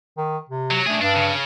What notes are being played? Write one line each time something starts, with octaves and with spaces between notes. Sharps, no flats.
D#3
C3
F#3
A3 D4 G#4
G2 D4
C#3